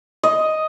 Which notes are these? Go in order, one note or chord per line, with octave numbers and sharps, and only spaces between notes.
D#5